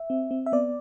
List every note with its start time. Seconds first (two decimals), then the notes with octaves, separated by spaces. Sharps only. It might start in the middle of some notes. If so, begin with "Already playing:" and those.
Already playing: E5
0.10 C4
0.31 C4
0.46 E5
0.52 B3 D5